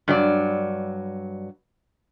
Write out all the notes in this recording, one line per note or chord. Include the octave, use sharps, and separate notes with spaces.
G2 F#3 D5